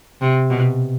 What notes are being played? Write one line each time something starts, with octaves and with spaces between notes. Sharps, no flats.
C3
B2